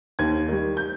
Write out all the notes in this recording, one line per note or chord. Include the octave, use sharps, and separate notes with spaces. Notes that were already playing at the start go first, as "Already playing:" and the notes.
D#2 G#6
D#3 G3
G6